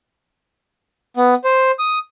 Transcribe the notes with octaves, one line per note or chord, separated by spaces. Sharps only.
B3
C5
D#6